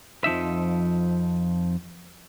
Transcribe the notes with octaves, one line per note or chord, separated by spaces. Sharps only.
F2 F3 D#4 E5